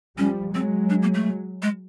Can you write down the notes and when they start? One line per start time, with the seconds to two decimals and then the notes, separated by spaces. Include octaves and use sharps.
0.18 F3 G3 C#4
0.54 F#3 G#3 C4
0.90 D4
1.02 A#3
1.14 A3
1.62 G#3